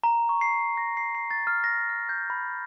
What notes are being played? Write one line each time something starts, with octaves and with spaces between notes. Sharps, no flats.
A#5
C#6
C7
A#6
C7
C7
A6
F6
A#6
F6
G6
B5